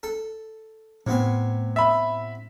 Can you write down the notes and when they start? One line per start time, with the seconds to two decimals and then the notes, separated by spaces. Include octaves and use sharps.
0.03 A4
1.07 A2 C3 B3 G#5
1.76 E5 B5